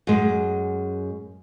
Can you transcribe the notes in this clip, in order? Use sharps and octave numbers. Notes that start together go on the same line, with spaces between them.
F#2 G#3